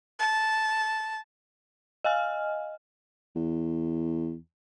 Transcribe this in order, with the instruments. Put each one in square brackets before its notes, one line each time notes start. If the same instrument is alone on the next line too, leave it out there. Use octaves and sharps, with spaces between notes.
[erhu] A5
[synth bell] D#5 F5 G#5 F6
[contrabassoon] E2